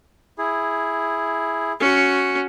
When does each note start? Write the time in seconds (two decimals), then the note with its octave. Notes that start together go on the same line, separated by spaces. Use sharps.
0.38 E4 G#4
1.80 C#4 F#4